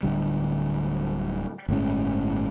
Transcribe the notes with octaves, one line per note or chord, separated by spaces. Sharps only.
D1 C2 D3 G3
G1 A2 G#3 C#4